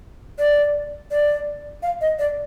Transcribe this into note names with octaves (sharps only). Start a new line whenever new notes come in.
D5
D5
F5
D#5
D5